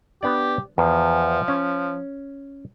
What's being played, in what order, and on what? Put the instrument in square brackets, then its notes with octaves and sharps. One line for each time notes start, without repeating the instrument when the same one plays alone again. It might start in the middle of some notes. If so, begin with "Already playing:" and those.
[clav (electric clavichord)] B3 D4 D5 [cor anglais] G4
[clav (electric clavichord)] E2 [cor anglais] F3
[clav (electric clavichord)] C#4